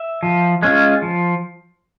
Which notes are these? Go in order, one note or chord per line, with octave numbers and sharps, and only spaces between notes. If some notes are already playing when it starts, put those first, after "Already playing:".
Already playing: E5
F3
G#3 C#4 F4
F3